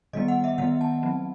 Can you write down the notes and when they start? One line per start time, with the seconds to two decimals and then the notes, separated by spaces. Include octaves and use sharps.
0.13 D#3 G3 B3 D#5
0.28 F#5
0.44 E5
0.58 D#3 G3 B3 F#5
0.81 A5
1.03 F#3 C4